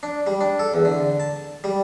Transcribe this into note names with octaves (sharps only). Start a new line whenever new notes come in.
D4
G3
D4
A4
E2
D3
A5
G3